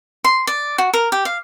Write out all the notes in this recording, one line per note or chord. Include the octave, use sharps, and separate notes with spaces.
C6
D5
F#4
A#4
G4
F5